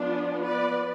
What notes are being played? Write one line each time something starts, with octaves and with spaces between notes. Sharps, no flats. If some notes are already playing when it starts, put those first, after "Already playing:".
Already playing: F3 B3 D4 F4
B4 D5